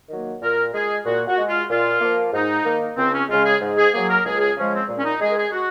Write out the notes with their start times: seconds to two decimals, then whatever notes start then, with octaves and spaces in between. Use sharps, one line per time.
0.09 D#3 F#3 A#3
0.42 A#2 A#4
0.74 G#3 G#4
1.05 A#2 F#4
1.27 F#4
1.38 G#3
1.48 F4
1.70 A#2 F4
2.01 F3 A#3
2.33 G#2 D#4
2.65 D#3 A#3
2.97 C#2 C4
3.13 C#4
3.29 C#3 G#3 F4
3.44 G#4
3.61 G#2
3.77 G#4
3.93 F#3 A#3 G#4
4.08 A#4
4.25 C#2 G#4
4.40 G#4
4.56 C#3 F3 G#3 C#4
4.73 C4
4.88 A#2
4.98 C#4
5.04 D#4
5.21 G#3 G#4
5.32 A#4
5.37 G#4
5.52 F#4